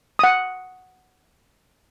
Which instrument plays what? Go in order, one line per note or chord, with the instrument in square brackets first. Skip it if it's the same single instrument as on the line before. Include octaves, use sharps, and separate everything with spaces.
[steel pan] F#5 D#6